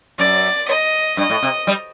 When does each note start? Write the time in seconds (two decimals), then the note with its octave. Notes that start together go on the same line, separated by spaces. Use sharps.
0.19 F#2 D5
0.68 D#5
1.17 G2 D#5
1.30 A2
1.43 C3
1.67 G3